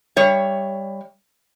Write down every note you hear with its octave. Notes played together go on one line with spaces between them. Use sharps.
G3 C#5 E5